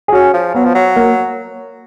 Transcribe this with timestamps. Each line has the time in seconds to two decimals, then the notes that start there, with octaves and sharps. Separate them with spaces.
0.08 G#4
0.12 C#4 F#4
0.33 F3
0.54 F#3 B3
0.65 F3
0.75 F#3
0.96 A#3